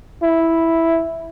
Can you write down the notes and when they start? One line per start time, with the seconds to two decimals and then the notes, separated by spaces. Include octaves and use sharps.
0.23 E4